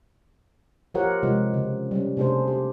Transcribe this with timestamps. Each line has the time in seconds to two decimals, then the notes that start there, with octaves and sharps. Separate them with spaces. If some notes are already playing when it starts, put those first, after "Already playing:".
0.94 F3 F4 G4 A#4 C#5 F#5
1.23 C3 F3 G#3 F#5
1.54 C#3
1.91 G3 C#4
2.17 C3 A3 D4 G#4 C5
2.48 G4